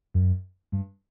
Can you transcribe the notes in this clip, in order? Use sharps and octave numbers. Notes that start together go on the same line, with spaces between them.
F#2
G2